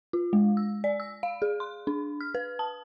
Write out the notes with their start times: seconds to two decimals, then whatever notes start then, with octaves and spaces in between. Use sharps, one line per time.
0.13 F4
0.33 G#3
0.57 E6
0.84 D5
1.00 E6
1.23 F5
1.42 G#4
1.60 C6
1.87 D4
2.21 F6
2.35 B4
2.59 A5